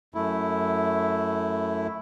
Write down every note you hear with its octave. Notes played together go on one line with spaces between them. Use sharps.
F#2 A3 E4